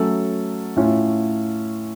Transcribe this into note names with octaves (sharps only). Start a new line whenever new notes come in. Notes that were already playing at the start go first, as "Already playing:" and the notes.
Already playing: F#3 A3 C#4 A4
A2 A3 C#4 F4